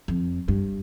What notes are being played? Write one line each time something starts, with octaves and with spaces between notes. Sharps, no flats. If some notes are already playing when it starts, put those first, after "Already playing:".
F2
G2